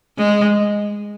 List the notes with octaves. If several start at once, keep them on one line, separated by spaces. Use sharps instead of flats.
G#3